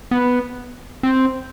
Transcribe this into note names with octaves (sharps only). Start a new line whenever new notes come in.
B3
C4